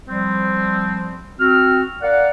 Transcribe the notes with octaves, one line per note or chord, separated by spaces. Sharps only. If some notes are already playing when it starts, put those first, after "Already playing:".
F3 G3 C4
C4 F#4 F6
A#4 D5 F5 F#5